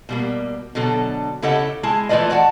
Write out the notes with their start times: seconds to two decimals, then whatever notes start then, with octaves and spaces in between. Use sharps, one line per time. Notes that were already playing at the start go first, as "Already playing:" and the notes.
0.09 B2 G3 A#3
0.75 B2 D3 F#3 A4
1.42 C#3 E4 G4 A4 D#5 F#5
1.83 G#3 E4 A5
2.09 E3 A3 F4 B4 D5 D#5
2.30 F#4 D5 F#5 A5